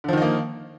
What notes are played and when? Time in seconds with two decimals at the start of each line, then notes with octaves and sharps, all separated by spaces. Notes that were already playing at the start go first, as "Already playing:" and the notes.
0.04 D3
0.08 F3
0.13 D#3
0.17 D#4
0.22 A#3